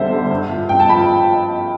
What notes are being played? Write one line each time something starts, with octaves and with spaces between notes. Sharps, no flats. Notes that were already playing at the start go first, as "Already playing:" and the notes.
Already playing: E2 D3 G3 C5 E5
D3 G3
G2
F3
G2 G5
A5
F3 B5